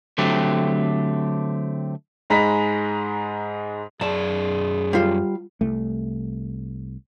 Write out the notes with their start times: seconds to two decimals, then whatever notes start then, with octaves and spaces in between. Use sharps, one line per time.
0.18 D3 F#3 A3 C4 G4
2.30 G#2 G#3 A#5 B5 B6
4.01 F#2 G#4 D5 A5
4.93 G3 F4
5.61 C2 A3